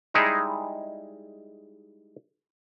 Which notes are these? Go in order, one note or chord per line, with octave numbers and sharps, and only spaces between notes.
G3 G#3 D#4 E4 G#4